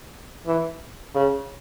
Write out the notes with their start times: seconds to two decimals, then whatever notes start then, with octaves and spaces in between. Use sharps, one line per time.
0.47 E3
1.15 C#3